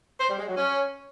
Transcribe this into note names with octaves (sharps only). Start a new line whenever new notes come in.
C5
G3
G#3
F#3
C#4